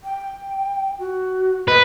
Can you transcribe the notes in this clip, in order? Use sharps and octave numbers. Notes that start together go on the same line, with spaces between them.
G5
F#4
B4 D#5